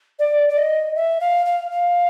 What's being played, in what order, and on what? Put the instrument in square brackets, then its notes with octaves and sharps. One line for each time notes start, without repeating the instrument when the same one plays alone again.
[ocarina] D5
D5
D#5
E5
F5
F5
F5